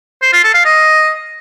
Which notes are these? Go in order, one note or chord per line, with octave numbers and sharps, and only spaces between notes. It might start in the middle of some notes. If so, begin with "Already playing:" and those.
C5
F4
A4
F5
D#5